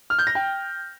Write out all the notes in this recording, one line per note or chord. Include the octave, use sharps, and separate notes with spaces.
F6
G6
A#6
G5